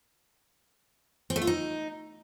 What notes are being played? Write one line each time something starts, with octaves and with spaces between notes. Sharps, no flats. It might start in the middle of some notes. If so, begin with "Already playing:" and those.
C4
A3
F4
D#4